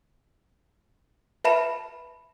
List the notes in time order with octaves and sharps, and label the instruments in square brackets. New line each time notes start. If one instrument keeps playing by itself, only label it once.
[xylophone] B4 E5 A5 B5 E7